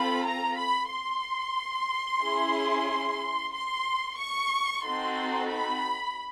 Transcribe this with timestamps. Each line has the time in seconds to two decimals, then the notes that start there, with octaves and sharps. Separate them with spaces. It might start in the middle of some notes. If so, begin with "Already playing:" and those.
Already playing: C4 F4 A4 B5
0.25 A#5
0.58 B5
0.90 C6
2.22 C#4 E4 G#4
3.53 C6
4.19 C#6
4.84 C4 D#4 F#4 A4 C6
5.50 B5